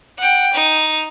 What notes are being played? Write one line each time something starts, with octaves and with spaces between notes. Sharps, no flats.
F#5 G5
D#4